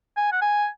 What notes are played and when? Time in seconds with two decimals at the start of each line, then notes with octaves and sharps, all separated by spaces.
0.17 G#5
0.32 F#5
0.42 G#5